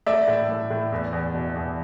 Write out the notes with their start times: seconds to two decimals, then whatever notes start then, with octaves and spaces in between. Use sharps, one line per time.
0.06 A3 D5 E5
0.28 A2
0.49 A2
0.71 A2
0.92 E2
1.13 E2
1.34 B2
1.55 E2